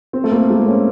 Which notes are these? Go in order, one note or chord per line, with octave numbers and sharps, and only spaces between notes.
C4
A3
A#3
G#3
C4
C#4